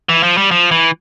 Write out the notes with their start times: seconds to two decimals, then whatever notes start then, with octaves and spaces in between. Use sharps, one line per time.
0.09 E3
0.23 F3
0.37 G3
0.51 F3
0.71 E3